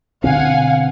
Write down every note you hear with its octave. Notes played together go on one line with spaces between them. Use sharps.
B2 D3 C4 F5 F#5 G#5